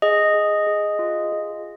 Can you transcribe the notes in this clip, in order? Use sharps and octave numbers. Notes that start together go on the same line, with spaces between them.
G#4 D#5
G#4
G#4
F4
G#4